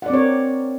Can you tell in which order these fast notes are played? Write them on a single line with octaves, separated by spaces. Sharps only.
F#5 D5 C4 C#5 A#4